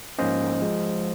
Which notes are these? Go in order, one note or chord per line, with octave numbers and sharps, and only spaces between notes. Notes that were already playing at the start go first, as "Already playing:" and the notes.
G#2 F3 A#3 C#4 C5 D#5
F3 G#3